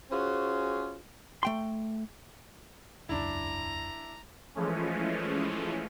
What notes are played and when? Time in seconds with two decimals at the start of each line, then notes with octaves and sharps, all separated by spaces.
0.11 C#4 F4 F#4 G#4 C5
1.43 A3 G5 C6
3.09 E1 C#2 F#2 D4 E4 A#5
4.55 E3 F3 G#3 A3 C#4